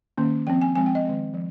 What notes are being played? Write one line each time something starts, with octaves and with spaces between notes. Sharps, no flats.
D#3 A#3 C#4
F3 C4 G5
G#5
F3 G#3 C4 G#5
G5
D#5
D#3 G#3 C4
F3